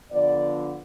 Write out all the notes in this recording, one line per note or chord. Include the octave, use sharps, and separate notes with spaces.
D3 F3 B3 D5